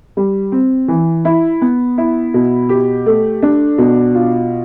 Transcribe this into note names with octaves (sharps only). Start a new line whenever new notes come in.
G3
C4
E3
E4
B3
E4
B2
G4
A3
D4
B2
F4